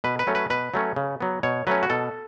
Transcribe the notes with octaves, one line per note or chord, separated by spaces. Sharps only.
B2 B4
B4
F#3 A3 C#4
B4
B2 B4
F#3 A3 C#4
C#3
F#3 B3
B2 C#5
F#3 A3 C#4 B4
F#4
B2 A4